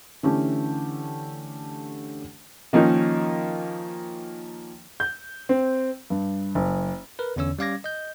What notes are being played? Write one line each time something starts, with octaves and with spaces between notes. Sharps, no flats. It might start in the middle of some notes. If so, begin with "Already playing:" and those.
D3 E3 A3 C#4 G4
D#3 F3 A#3 C#4 D#4
G6
C4
G2
F#1
A#4 B4
E2 D3 C#4 C#5 E6
G3 C#4 F5 D6 G#6 A#6
D#5 G6